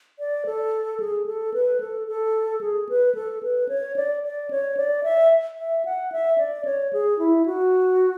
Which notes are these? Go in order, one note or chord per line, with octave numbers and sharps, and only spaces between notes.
D5
A4
G#4
A4
B4
A4
A4
G#4
B4
A4
B4
C#5
D5
D5
C#5
D5
E5
E5
F#5
E5
D5
C#5
G#4
E4
F#4